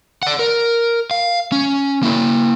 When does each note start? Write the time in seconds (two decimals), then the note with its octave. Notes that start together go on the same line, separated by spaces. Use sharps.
0.23 D5 F#5
0.39 A#4
1.11 F5
1.52 C#4
2.03 A#3 E4